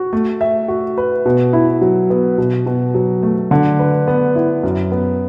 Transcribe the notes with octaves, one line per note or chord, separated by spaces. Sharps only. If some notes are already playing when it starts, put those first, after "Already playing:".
Already playing: F#4
A3
E5
F#4
B4
B2
E4
F#3
B3
B2
B2
F#3
A3
D3
B4
B3
E4
F#2
B3